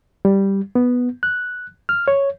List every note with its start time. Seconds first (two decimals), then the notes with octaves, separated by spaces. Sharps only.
0.25 G3
0.75 B3
1.23 F#6
1.89 F6
2.08 C#5